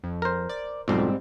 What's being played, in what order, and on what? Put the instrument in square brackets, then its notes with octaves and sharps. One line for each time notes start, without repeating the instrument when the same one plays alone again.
[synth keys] F2
[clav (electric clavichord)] A#4 C5
[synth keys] D5
[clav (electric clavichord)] B1 F2 [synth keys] G#2 G3 C4